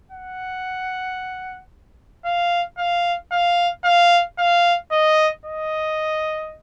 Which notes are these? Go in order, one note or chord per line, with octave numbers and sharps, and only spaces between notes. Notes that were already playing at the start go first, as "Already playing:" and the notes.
F#5
F5
F5
F5
F5
F5
D#5
D#5